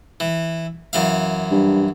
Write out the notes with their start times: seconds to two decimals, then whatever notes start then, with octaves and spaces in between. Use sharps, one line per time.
0.20 E3
0.93 F#2 E3 F5
1.51 G2